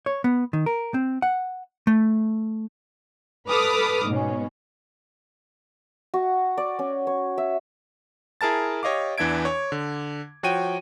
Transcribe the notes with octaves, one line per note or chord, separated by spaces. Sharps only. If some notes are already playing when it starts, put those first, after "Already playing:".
C#5
B3
D#3
A#4
C4
F#5
A3
A4 B4 B5 D6 D#6 F6
G#2 B2 C#4
F#4
D5
C#4
C#5
E5
E4 G#4 A#4 A5 A6
G4 C#5 D#5 F5 D6
E2 E3 D4 E5 G#6 D7
C#5
D3
F3 F#4 C#5 G5 D#7